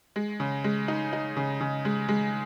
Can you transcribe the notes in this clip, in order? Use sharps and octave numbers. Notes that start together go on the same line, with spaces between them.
G#3
C#3
G#3
D#4
D#4
C#3
C#3
G#3
G#3